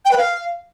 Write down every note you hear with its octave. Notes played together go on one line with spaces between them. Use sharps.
G5
B4
F5